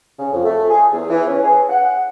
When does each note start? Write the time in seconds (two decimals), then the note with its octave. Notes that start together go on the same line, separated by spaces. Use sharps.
0.19 C#3
0.32 F2
0.45 A3
0.70 G#4
0.92 E2
1.10 E3
1.27 C#4
1.42 G#4
1.70 F#5